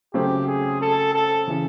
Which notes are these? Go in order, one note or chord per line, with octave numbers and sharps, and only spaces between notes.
C#3 F#3 A3 C4 G4
G#4
A4
A4
C#3 E3